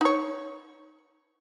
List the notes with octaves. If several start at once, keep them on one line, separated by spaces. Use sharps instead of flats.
D#4 C#5